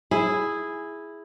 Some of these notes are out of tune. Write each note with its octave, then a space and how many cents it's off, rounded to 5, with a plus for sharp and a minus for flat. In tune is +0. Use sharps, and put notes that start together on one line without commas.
E4 +0 G#4 +0